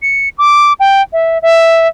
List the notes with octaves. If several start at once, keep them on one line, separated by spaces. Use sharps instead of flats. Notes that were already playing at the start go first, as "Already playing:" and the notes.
C#7
D6
G5
E5
E5